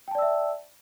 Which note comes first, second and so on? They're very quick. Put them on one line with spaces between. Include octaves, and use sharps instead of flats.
G5 A5 D5 E6 E5